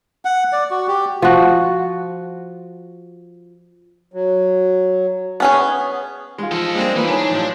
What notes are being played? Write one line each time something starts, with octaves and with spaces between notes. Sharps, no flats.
F#5
D5
F#4
G4
F3 F#4
F#3
B3 C#4 G#4
G#3 F4
F3 A4 D#5
G3 G#3 A#3 C4 D4 G#4
E3 F3 A#3 D#4 B4
E3 D4 D#4 C#5 G#5
A2 F3 F#3 G#3